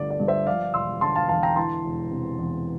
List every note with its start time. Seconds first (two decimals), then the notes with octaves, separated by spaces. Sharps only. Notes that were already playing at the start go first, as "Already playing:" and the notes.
Already playing: G1 D3 A3 D5
0.10 D5
0.20 G2
0.28 C5 E5
0.46 F3 D5 F5
0.74 E1 C6 E6
1.01 D3 A5 C6
1.16 F5 A5
1.29 E2 F5 A5
1.43 G5 A#5
1.56 E3 A5 C6
1.85 E1
2.11 C3
2.39 E2